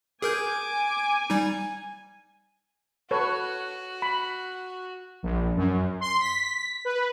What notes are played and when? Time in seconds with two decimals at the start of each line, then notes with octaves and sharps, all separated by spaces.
0.22 G#4 A#4 G#5 D6 G6
1.30 G3 D#4
3.11 F#4 A4 B4 C#5
4.02 B5
5.23 A#1
5.56 F#2
6.01 C6
6.21 B6
6.85 B4